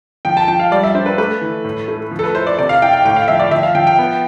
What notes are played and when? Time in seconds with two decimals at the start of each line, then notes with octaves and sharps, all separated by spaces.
0.25 F3 G5
0.37 A5
0.48 F3 G5
0.60 F5
0.71 G3 D5
0.83 E5
0.95 D4 C5
1.06 B4
1.18 A3 B4
1.41 E3
1.64 A2
1.88 A3
2.11 F3
2.19 A4
2.23 B4
2.35 E4 C5
2.47 D5
2.58 C3 D5
2.69 F5
2.82 E4 G5
2.93 G5
3.05 A2 G5
3.16 F5
3.28 F3 E5
3.40 D5
3.51 F3 E5
3.63 F5
3.75 F3 G5
3.87 G5
3.99 B3